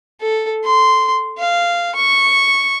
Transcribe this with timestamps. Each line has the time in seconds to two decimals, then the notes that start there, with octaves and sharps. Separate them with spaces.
0.21 A4
0.64 C6
1.38 F5
1.95 C#6